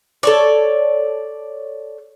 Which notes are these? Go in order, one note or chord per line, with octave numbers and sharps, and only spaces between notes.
A4 C#5 D5